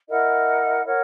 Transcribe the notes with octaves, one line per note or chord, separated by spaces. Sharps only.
E4 A#4 D#5 F#5
A#4 C#5 F#5